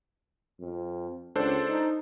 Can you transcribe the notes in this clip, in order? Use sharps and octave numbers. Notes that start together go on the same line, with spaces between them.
F2
C#2 D4 A4 C5
D#4